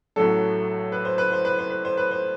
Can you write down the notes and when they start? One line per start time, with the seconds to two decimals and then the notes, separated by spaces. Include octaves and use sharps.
0.16 A1 A2 F#3 A4
0.92 B4
1.05 C5
1.18 B4
1.32 C5
1.45 B4
1.59 C5
1.71 B4
1.85 C5
1.97 B4
2.11 C5